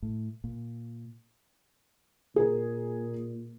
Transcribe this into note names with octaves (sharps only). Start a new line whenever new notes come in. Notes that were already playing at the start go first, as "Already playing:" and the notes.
A2
A#2
A#2 G#4 A#4